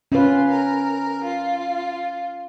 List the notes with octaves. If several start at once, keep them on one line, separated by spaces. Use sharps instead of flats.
C#4 F4 B4
A#4
F4